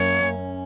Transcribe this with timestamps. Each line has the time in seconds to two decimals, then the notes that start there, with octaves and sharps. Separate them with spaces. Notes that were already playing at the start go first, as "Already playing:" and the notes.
Already playing: F#2 A#3 C#5
0.21 C#4